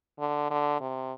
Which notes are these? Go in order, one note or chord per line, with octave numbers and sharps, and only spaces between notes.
D3
D3
C3